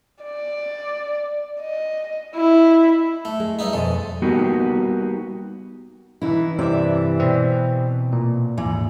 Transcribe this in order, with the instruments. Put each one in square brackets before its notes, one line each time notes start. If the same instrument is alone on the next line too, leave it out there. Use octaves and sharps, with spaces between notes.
[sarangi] D5
D#5
E4
[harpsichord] A3
[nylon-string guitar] G#3
[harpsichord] G2 D#4 E4
[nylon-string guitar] F2 B2 D#5 [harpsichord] G#3
[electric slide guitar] G3 A#3 B3 D#4 F#4 G4
[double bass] E3 [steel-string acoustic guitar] D#4 E4
[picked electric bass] G2 [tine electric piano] C3 [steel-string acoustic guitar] D5 E5
[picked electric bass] B2 [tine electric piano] C4
[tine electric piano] A#2
[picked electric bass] D#2 G#2 A#3 [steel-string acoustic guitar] E3